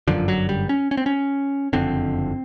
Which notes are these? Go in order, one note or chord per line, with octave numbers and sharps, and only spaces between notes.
G1 F#2 D3 F3
F#3
G3
C#4
C#4
C4
C#4
F#1 F2 D3 C4